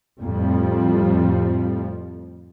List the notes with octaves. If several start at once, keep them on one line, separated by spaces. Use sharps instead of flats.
F2 A2 F3 G3